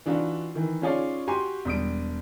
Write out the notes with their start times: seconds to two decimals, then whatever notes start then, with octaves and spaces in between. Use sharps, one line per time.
0.06 E3 D4 D#4 F4 F#4
0.55 D#3 E3
0.82 C#4 D#4 F4 G#4 C#5 D5
1.27 F#4 G4 G#5 C6
1.65 E1 G3 D#6 D7